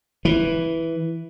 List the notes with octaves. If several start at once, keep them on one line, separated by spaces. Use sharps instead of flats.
E3